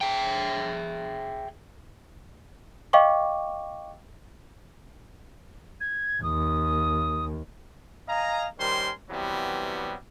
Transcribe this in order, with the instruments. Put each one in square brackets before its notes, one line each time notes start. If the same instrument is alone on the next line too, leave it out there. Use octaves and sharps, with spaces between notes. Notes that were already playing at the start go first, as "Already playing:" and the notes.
[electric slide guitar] G#4 E5 G5
[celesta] D#5 F5 G5 C#6 D6
[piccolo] G#6
[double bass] D#2 [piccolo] D#6
[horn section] D#5 F5 G#5 A#5
D#3 G3 C#4 A#4 C5 C6
C3 E3 F#3 G3 B3